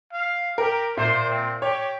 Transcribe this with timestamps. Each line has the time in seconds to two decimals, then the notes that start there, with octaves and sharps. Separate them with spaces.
0.12 F5
0.58 G4 A#4
0.97 A#2 C5 E5
1.30 C4
1.62 G4 C#5